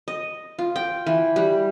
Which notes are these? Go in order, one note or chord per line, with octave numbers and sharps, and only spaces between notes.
D#5
F4
G5
E3
G3